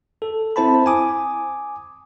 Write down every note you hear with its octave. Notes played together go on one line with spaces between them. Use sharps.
A4
C4 E4 C5 A5 B5
G#5 D6 D#6